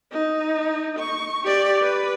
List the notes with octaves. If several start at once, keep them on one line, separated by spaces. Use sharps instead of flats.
D#4
C#6
G4 D5
B4